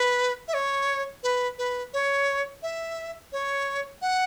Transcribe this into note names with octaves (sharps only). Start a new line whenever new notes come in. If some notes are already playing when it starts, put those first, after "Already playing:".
Already playing: B4
E5
C#5
B4
B4
C#5
E5
C#5
F#5